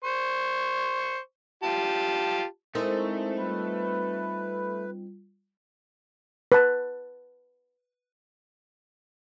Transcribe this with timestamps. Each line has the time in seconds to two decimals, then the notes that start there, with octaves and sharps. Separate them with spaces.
0.04 C5 C#6
1.63 F4 G4 A5
2.75 G#3 A3 C4 D#4 E4 A4 A#4
3.37 G3 F4 B4
6.52 B4 A5